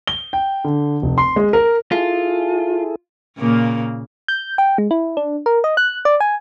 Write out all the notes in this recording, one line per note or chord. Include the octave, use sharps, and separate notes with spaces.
G7
G5
D3
F1
C6
G#3
A#4
E4 F4 G#4 A4
A#2 C#3 A#3
G6
G5
G#3
E4
D4
A#4
D#5
F#6
D5
G#5